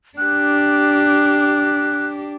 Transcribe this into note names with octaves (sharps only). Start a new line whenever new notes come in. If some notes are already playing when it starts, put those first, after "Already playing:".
D4 G4 F#6